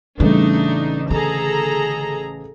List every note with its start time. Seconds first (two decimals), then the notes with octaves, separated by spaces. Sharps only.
0.20 A1 C#3 G3 A3 D4 D#4
1.10 D3 G#4 A4 A#5